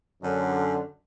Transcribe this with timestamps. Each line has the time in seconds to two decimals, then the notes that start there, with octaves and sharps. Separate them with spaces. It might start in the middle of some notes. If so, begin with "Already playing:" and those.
0.22 F#2 D3